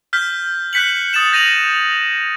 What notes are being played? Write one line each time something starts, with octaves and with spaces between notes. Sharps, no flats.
F6 G6 B6 G7
F#6 G6 B6 C#7 F#7
D#6 A6 C#7 E7 F#7
G6 A#6 D#7 F7 F#7